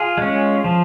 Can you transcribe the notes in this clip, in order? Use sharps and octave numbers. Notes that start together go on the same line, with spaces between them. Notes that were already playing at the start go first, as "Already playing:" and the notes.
Already playing: F4 G#4
G#3 C#4
F3